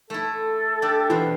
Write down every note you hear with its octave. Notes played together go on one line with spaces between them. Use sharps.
A3 E4 A4
D4 G4 D5
E2 B2 E4 C5